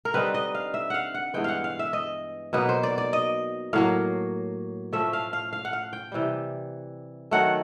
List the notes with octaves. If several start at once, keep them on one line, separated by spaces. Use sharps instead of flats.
A#4
D3 G3 C4 D#4 B4
D#5
F5
E5
F5 F#5
F#5
G2 E3 G#3 B3 G5
F5 F#5
F5
E5
D#5
B2 F#3 A#3 D#4 B4
C5
D5
D5
D#5
A2 F#3 A#3 F5
F3 A3 C#4 E5
F5
F5
F5
F#5
F5
G5
C3 E3 G3
D#3 F#3 A3 F#5